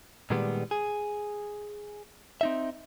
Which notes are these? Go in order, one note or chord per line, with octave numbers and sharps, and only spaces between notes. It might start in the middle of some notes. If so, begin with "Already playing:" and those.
A#2 D#3 G3 G#3 B3
G#4
C4 D#4 E5